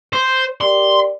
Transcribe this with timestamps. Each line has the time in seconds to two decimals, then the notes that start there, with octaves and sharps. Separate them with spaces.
0.13 C5
0.61 G4 A#4 D5 C6